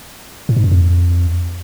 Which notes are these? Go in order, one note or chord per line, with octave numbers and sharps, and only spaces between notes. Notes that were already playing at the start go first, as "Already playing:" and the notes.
A2
G#2
F#2
F2